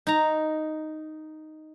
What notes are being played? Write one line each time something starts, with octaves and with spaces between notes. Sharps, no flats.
D#4 A#5